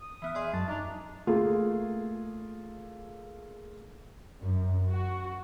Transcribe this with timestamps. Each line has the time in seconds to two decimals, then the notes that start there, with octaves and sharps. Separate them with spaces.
0.01 D#6
0.22 E3 B3 E5 F6
0.35 G#4 D5 D#5 C6
0.53 F#2 F#3 A5
0.68 D4 D#4 A#5
1.27 A3 A#3 F4 G#4
4.41 F#2
4.87 F#4